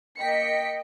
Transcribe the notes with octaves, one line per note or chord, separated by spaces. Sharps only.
A#3 D#5 G5 B6 C#7